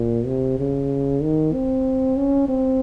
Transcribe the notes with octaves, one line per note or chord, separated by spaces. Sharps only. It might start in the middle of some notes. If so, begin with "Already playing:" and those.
Already playing: A#2
C3
C#3
D#3
C4
C#4
C4